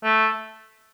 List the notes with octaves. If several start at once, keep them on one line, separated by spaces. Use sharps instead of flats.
A3